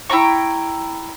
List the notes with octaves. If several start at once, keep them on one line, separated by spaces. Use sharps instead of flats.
E4 G5 A#5 C#6